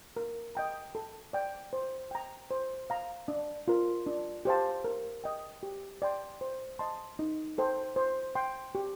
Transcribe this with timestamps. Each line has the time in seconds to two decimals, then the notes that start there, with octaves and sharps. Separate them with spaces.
0.17 A#4
0.55 D#5 G5 A#5
0.95 A4
1.33 D5 G5
1.73 C5
2.11 G5 A#5
2.51 C5
2.90 F5 A#5
3.28 D4
3.68 F4 A#4
4.06 D4
4.45 G4 C5 F5 A5
4.84 A#4
5.24 D#5 G5
5.63 G4
6.02 D5 G5 C6
6.41 C5
6.79 D#5 A5 C6
7.19 D#4
7.58 A4 C5 G5
7.96 C5
8.35 G5 C6
8.75 G4